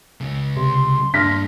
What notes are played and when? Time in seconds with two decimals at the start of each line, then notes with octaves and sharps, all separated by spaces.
0.21 C#2 C#3
0.57 C3 C6
1.14 G2 A#2 D4 F6 A#6 B6